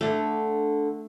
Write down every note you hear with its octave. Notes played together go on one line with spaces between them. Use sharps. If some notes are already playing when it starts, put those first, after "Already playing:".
D3 A3 D4